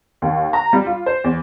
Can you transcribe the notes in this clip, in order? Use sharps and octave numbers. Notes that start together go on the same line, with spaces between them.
D#2
A#5
G3
F4
C5
E2